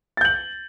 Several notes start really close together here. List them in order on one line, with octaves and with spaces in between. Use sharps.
A6 G6 F#7